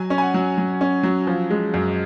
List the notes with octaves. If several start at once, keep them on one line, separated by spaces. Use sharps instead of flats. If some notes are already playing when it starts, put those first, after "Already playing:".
Already playing: F#3 G#5
C#4
G#5
F#5
F#3
F#3
C#4
F#3
F3
G#3
F#2